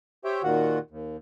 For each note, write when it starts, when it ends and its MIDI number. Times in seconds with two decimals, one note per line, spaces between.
0.25 0.42 67
0.25 0.42 72
0.25 0.42 73
0.25 0.42 76
0.25 0.42 79
0.44 0.79 39
0.44 0.79 46
0.44 0.79 51
0.44 0.79 65
0.44 0.79 66
0.44 0.79 78
0.90 1.17 39